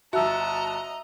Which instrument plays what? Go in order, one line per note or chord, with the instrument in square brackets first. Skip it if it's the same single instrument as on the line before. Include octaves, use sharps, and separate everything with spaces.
[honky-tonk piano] G1 F#4 [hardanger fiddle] D#5 A#5 [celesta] E5 E6 [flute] A5